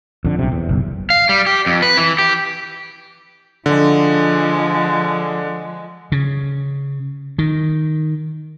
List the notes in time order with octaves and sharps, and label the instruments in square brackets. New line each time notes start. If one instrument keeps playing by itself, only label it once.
[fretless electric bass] F2 D3
B1 C3
E2
F#1 B1
[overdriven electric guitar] F5
G3
G4
F2
B4
E3
G4
[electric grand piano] D3 [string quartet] F3 G#3
[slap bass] C#3
D#3